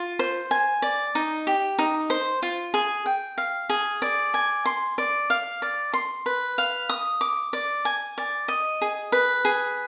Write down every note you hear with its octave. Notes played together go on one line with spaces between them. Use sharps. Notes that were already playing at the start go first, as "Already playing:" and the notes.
Already playing: F4
C5
G#5
D5
D#4
G4
D#4
C5
F4
G#4
G5
F5
G#4
D5
G#5
C6
D5
F5
D5
C6
B4
F5
D#6
D6
D5
G#5
D5
D#5
G#4
B4
G#4